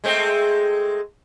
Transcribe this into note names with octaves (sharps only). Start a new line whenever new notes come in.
G#3 A3 C4